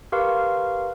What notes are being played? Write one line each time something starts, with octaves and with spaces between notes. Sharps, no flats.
G4 A#4 B4 F5 C6 C#6